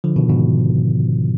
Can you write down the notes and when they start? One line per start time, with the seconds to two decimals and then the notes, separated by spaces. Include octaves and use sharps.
0.04 D3 F3
0.16 B2 D#3
0.29 G#2 B2